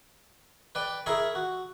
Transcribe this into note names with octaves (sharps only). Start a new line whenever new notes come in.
B4 D5 G5
E4 G#4 A#4 B5 C#6
F#4